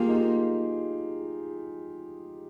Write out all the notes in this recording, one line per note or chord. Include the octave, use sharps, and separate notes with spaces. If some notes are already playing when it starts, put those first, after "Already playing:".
Already playing: A#3 F4 G4 G#4
D#4
F4